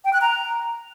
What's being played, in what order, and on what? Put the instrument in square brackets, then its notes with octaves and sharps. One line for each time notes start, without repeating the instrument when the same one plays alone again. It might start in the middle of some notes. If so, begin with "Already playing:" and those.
[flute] G5
F#6
A#5